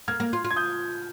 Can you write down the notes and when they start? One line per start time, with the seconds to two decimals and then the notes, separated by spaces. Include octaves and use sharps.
0.08 A#3 F6 G#6
0.20 A#3
0.33 F4
0.45 F4
0.51 G#6
0.56 D#6 G6